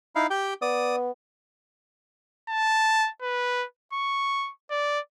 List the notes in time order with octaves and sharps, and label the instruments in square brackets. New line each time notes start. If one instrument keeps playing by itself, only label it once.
[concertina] D#4 E4 F5
G4 G5
[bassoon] B3 [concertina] D5 D#6
[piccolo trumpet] A5
B4
C#6
D5